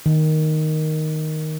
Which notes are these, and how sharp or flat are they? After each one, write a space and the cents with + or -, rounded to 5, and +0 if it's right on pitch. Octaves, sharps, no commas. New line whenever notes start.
D#3 +0